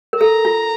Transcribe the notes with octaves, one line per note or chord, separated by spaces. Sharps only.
A#4
A4 A#5
F4